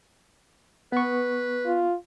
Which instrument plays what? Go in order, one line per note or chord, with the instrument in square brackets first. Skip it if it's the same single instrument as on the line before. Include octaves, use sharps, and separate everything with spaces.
[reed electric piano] B3 C#6 [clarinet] B4
[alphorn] F4